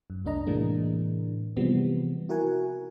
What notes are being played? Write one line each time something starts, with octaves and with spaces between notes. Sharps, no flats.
F#2
C2 F#2 A3 D4 D#5 A#5
A2 C3 E3 G#3 A#3 D4
C3 E3 F3 G3 G#3 B3
E4 F#4 A#4 F#5 G#5